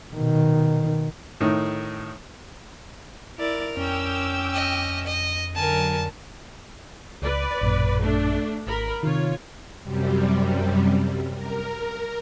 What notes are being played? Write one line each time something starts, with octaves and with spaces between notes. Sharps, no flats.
B2 D#3
A2 D#3
E4 A#4 D5
F2 C#4 G5 D6 E6
D#5
D#5
D3 F#3 A#4 G#5 A5
C#2 B4 D5
A1 F#2 A#2
A3 D4
G#1 A#4 B5
C3 D#3 F4 C#5
F#2 C3 G3
A#4